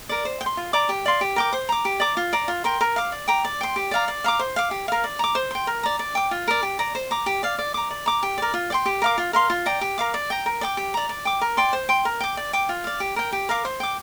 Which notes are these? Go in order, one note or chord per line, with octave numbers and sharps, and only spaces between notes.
A#4 D5
C5
G5
C6
F4
D5 A#5 D6
G4
D5 F5 C6
G4
A#4 G5 D6
C5
A#5 D6
G4
D5 A#5 D6
F4
D5 A#5
F4
A#4 G5 C6
A#4
F5 D6
D5
G5 A#5 D6
D5
G5 C6
G4
D5 F5 A#5
D5
F5 A#5 D6
C5
F5 D6
G4
A#4 F5
D5
A#5 D6
C5
G5 C6
A#4
D5 A#5
D5
G5 D6
F4
A#4 D5
G4
D5 A#5
C5
A#5 D6
G4
D5 F5
D5
A#5 D6
D5
A#5 D6
G4
A#4 D5
F4
D5 G5 C6
G4
A#4 F5 D6
F4
A#4 F5 C6
F4
D5 G5 A#5
G4
A#4 F5 D6
D5
G5 A#5
A#4
D5 G5 D6
G4
D5 A#5
D5
G5 D6
A#4
D5 G5 C6
C5
G5 C6
A#4
G5 D6
D5
G5 D6
F4
D5 F5
G4
A#4 G5
G4
A#4 F5 D6
C5
G5 D6